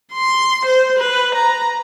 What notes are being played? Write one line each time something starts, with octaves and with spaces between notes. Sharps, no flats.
C6
C5
B4
A#5